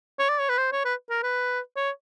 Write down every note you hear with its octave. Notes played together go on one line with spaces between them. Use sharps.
C#5
D5
C#5
B4
C5
C#5
B4
A#4
B4
C#5